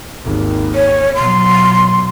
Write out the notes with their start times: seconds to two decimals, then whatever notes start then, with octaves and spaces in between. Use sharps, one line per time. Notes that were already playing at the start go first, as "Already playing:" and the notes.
0.25 G#1 D#2
0.75 C#5
1.15 B2 F#3 C6